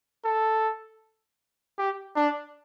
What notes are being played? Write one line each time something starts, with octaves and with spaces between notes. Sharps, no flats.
A4
G4
D4